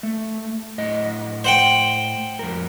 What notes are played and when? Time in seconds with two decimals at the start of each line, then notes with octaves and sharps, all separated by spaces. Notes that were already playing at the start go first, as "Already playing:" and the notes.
0.03 A3
0.78 A2 D#5
1.45 C5 F#5 G5
2.39 F2 A#4